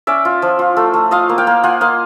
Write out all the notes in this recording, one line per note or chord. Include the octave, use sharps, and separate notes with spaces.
C#4 D5 E5
F4
F3
F4
A3
A3
F4 D#5 F5
A#3
F5 G5
A#3
F4 F#5 G#5
A#3 D#5 F5